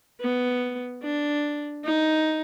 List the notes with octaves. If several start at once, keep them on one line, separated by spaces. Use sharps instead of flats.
B3
D4
D#4